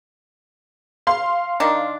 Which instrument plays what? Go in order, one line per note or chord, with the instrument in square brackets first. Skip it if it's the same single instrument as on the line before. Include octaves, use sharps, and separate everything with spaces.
[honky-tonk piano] F5 C6
[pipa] D#3 D4